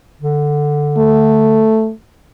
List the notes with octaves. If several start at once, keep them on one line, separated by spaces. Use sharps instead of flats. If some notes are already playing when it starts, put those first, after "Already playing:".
D3
A3